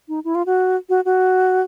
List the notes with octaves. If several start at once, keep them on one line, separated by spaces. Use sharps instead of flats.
D#4
E4
F4
F#4
F#4
F#4